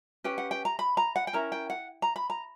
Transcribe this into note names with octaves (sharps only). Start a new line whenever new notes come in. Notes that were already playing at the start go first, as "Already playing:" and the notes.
C#4 G4 B4 G5
F#5
G5
A#5
B5
A#5
F#5
G5
C#4 E4 A#4 A#5
G5
F#5
A#5
B5
A#5